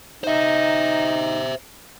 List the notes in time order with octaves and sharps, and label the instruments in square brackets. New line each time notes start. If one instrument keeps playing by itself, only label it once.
[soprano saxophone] D#4 [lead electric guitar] C5 E5